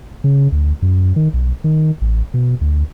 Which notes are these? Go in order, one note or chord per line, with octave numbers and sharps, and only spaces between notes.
C#3
D2
F#2
D#3
B1
D#3
A1
B2
D2